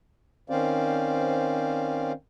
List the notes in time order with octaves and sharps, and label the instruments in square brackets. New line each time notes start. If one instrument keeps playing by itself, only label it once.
[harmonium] D#3 C4 C#4 C5 D5 F5